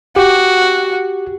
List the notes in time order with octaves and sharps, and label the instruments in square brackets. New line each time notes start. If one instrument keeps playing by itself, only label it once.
[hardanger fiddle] F#4 [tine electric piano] G4